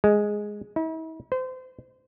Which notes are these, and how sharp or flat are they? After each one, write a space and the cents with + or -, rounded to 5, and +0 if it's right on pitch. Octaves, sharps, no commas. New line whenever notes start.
G#3 +0
E4 -45
C5 -30